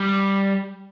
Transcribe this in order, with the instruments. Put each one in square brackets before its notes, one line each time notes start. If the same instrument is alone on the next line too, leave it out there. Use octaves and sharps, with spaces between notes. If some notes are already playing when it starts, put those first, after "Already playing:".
Already playing: [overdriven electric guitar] G3